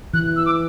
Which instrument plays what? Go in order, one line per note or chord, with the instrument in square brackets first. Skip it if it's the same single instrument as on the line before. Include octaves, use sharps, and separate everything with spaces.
[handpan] E3 [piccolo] F#6
[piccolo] E6
D6